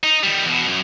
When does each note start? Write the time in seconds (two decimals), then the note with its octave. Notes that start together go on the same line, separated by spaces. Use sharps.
0.03 D#4
0.23 D#3 G3
0.45 E2 B2
0.66 C2 F#2